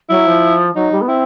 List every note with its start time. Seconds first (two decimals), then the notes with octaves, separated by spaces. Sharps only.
0.09 F#3 E4
0.27 F3
0.75 F#3 D#4
0.92 G3
1.01 B3
1.08 C4 E4